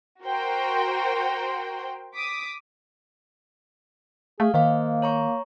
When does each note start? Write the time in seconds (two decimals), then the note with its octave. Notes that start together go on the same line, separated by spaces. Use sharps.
0.24 F#4 A#4 C5 G5 C6
2.14 D6 D#6 B6
4.40 A3 G#4 F5
4.54 D#3 A#3 C5 D#5 F5
5.02 C#5 A#5 C#6